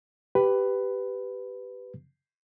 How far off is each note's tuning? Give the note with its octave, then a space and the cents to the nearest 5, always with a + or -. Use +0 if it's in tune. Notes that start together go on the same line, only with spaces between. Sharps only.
G4 -5 B4 +10